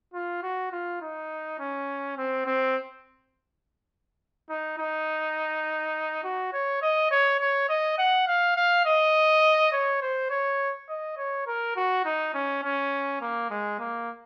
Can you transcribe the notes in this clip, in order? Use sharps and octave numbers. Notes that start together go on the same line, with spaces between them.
F4
F#4
F4
D#4
C#4
C4
C4
D#4
D#4
F#4
C#5
D#5
C#5
C#5
D#5
F#5
F5
F5
D#5
C#5
C5
C#5
D#5
C#5
A#4
F#4
D#4
C#4
C#4
A#3
G#3
A#3